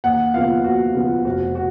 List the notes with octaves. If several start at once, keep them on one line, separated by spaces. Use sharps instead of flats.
D#2 F#5
C#3 F3 B3 F4 F5
D#2 F#4
C#3 F3 B3 F4
F1 F#4
F#4